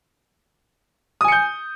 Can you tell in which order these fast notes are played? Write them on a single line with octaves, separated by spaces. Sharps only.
D#6 G#5 C#7 G6